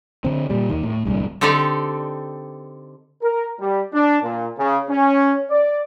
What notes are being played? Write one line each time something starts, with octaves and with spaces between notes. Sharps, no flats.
D3 C4
A#2 G3
D#2 D#3
A2
D1 G1 C2 G2
D3 C4 D#4 G4 A4 D5
A#4
G3
D4
A#2
C#3
C#4
D5